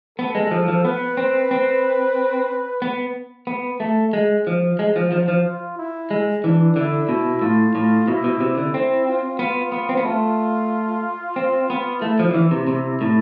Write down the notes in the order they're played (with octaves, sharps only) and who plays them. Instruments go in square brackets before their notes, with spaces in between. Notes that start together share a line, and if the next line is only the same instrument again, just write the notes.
[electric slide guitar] B3 [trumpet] A4
[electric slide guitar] G#3
G#3
F3
F3
[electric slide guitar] B3 [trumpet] B4
[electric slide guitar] C4
C4
B3
B3
A3
G#3
F3
G#3
F3
F3
F3
[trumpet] F4
E4
[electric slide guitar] G#3
[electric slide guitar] E3 [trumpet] D4
[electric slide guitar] D3 [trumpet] E4
[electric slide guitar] B2
[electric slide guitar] A2 [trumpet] F4
[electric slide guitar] A2
[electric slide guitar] B2 [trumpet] E4
[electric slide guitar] B2
C3
D3
[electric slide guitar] C4 [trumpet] E4
[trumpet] F4
[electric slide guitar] B3 [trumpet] F4
[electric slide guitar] B3
C4
B3
[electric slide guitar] A3 [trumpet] F4
[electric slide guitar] C4
B3
[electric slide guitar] A3 [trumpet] E4
[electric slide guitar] F3
D3
E3
C3
C3
A2